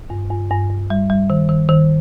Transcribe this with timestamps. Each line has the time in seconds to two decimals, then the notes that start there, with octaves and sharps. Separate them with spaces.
0.10 G2
0.31 G2
0.50 G2
0.70 G2
0.90 G3
1.10 G3
1.30 D#3
1.49 D#3
1.69 D#3